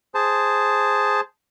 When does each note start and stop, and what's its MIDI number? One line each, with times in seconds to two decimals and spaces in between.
0.15 1.21 68
0.15 1.21 72
0.15 1.21 81